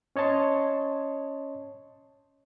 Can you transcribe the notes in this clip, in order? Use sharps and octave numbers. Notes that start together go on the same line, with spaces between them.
C#4 C#5 D#5 A5 C6